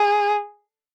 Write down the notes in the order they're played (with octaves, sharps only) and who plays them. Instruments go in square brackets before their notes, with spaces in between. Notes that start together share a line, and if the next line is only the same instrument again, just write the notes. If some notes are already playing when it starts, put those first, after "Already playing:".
Already playing: [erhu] G#4